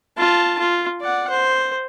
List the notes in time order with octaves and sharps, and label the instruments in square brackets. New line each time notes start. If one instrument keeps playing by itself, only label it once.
[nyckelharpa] F4 A5
F4
D5 F#5
C5